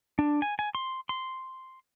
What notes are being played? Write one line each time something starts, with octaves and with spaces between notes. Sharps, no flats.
D4
G#5
G#5
C6
C6